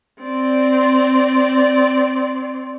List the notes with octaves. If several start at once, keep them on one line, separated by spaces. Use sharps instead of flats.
C4 D5